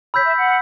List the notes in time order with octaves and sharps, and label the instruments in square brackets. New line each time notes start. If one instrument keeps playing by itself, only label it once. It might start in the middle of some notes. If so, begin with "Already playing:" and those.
[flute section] C#5 [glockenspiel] B5 E6 G6 B6
[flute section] E5
F#5